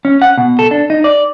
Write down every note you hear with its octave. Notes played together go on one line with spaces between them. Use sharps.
C#4
F#5
B2
A4
D4
D#4
D5